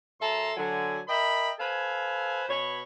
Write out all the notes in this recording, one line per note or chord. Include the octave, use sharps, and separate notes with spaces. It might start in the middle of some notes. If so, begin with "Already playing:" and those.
F#2 A4 E5 A5 A#5 C6
D3 F#3 G#5
A#4 D#5 E5 G5 B5
A4 B4 C5 F5 G#5
B2 C#5 B5